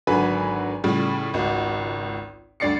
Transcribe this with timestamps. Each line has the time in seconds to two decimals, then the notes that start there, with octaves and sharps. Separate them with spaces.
0.07 G#1 D3 F#3 B4 G#5
0.84 A2 C#3 F3 G3
1.34 G#1 C#2 F#4
2.60 D2 G2 D5 A6 C7 C#7